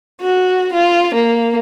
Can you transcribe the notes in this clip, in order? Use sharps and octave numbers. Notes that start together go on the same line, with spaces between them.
F#4
F4
A#3